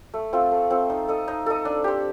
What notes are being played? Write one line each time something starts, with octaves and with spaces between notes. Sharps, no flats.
A3
C4 F4 A4
A3
C4 F4 A4
D#4
A4 D#5
D#4
A4 D#5
D4
G4 C5